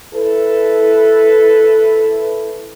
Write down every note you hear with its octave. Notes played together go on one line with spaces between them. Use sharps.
E4 A4 B4